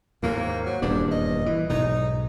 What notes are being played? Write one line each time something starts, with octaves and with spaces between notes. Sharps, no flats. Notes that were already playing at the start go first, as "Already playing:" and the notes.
D#2 G#2 A#3
F#3
D#1 E2 G2 D4
D#5
E3
B1 G#2 D#4